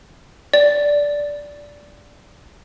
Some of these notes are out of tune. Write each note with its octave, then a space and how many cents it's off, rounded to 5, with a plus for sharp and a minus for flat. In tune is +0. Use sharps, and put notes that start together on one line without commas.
D5 -10